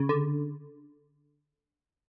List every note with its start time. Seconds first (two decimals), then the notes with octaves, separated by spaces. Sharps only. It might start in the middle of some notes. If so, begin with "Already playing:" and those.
Already playing: C#3
0.09 D3